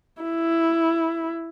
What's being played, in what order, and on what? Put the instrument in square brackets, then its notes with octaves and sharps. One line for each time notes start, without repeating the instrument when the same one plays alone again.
[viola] E4